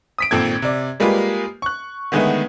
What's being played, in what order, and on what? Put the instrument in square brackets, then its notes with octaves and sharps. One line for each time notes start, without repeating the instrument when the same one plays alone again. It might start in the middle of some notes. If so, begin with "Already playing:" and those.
[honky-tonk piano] D#6 B6 D7
G#1 A#2 C4 A4 G#6
C3 D5
G3 G#3 A#3 F4 G4 B4
C#6 F#6
D3 D#3 G#3 A3 B3